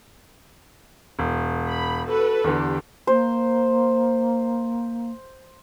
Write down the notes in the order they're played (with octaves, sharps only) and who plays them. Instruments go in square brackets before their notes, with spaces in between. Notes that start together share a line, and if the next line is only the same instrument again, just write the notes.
[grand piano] E1
[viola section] B5
F#4 A4 B4
[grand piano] E2 D3 [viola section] G4
[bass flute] A#3 [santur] C5